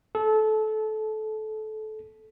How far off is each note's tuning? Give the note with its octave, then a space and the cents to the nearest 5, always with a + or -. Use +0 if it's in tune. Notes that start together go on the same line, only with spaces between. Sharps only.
A4 -25